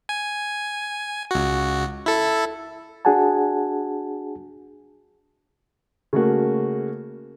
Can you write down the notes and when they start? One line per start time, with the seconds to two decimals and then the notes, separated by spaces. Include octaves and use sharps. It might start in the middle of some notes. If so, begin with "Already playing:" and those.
0.09 G#5
1.31 C#2 F#4
2.06 E4 A4
3.05 D4 F#4 G#4 F#5 G#5 A5
6.13 C#3 A3 A#3 F#4